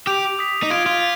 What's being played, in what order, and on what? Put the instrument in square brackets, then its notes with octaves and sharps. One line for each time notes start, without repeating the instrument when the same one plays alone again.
[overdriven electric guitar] G4 [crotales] D6 G6 D7 F7
[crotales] D#6 B6 F7
[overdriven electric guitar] D#4
[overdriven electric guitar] F4 [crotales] G#6 D7 F7
[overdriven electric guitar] F4